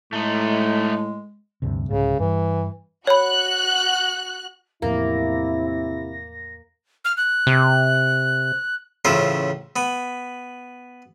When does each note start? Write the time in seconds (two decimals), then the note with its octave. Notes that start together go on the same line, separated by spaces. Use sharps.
0.13 A2 G#3 A3 D#4
1.62 D2 G2 C3
1.89 C2 G#2 C#3
2.20 G2 E3
3.07 F#4 C#5 B5 F#6
4.82 E2 A2 C3 F3 A#3 C4 E4 A#6
7.05 F6
7.17 F#6
7.47 C3
9.05 A1 C#3 E4 F4 A#4 C5
9.76 B3 B5